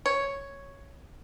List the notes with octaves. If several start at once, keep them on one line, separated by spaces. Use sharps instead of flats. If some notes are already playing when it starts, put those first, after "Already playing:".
C#5